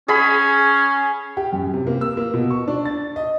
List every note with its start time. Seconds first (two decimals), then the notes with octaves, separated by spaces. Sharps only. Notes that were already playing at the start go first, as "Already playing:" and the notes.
0.08 C#4 G#4 B5
1.37 G4
1.53 F#2
1.74 C3
1.87 A#3
2.01 E6
2.17 A#3
2.34 B2
2.50 C#6
2.68 D4
2.85 A6
3.16 D#5